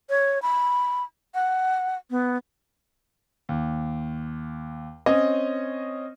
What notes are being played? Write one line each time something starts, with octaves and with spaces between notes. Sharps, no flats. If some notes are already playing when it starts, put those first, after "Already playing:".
C#5
B5
F#5
B3
D#2
C4 C#4 C#5 D#5